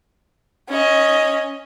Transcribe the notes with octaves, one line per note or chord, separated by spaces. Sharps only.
C#4 D#5